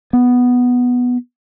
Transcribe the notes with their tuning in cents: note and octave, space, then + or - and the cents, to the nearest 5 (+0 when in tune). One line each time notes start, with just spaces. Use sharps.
B3 +0